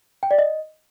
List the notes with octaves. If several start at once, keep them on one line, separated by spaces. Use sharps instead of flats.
G5
D5
D#5